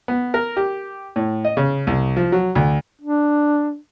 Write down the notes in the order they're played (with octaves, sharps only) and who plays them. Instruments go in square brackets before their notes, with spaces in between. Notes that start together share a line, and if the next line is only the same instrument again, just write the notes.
[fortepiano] B3
A#4
G4
A2
D#5
C#3
C2
F3
F#3
D2
[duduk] D4